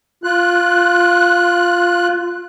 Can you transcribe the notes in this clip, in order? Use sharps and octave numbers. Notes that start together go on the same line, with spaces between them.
F4 F#6